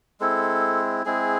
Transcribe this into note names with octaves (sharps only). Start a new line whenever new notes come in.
G#3 C4 E4 A4
G#3 C4 E4 G#4